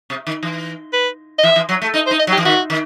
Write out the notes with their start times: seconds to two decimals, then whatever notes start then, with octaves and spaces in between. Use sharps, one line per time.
0.10 C3
0.27 D#3
0.43 E3
0.93 B4
1.39 D#5
1.43 E3 E5
1.56 E3
1.69 F#3
1.82 A3
1.94 D#4 D#5
2.06 C5
2.11 D#4
2.19 D#5
2.27 F#3
2.32 G4
2.37 E3
2.45 D#3 F#4
2.70 D#3